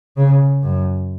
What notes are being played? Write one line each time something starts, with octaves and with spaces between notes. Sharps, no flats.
C#3
F#2